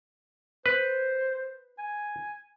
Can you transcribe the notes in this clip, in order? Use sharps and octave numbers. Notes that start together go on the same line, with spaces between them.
B4 C5
G#5